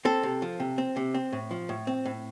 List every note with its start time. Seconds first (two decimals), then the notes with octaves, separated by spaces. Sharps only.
0.05 C4 A4
0.23 C3
0.42 F3
0.60 C3
0.78 C4
0.97 C3
1.14 C4
1.33 A2
1.51 F3
1.69 A2
1.87 C4
2.06 A2